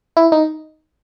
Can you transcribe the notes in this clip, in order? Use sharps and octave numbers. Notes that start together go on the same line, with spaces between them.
E4
D#4